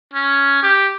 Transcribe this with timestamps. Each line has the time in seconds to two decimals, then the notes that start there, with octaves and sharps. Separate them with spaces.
0.14 C#4
0.62 G4